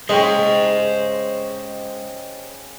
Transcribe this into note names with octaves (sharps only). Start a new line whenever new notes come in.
C#3 G#3 G4 C5 D#5 C#6